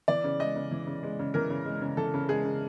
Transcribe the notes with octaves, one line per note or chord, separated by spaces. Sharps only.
E3 D5
C#3
G#3 D#5
C#3
E3
C#3
G#3
C#3
E3 A#4
C#3
G#3
C#3
E3 A4
C#3
G#3 G#4
C#3